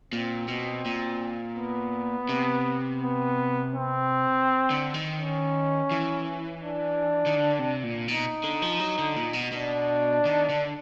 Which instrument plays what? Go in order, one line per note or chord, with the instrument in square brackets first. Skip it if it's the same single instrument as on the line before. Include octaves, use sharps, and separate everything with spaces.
[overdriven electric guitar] A#2 [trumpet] C4
[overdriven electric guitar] B2
A#2
[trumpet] B3
[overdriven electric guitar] C3
[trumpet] B3
C4
[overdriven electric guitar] D3
D#3
[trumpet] C#4
[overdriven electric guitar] E3
[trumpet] D4
[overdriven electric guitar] D#3
D3
C3
A#2
[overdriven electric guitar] B2 [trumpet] D#4
[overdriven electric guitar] D3
F3
F#3
D3
A#2
B2
[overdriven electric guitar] B2 [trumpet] D4
[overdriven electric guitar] D#3
D3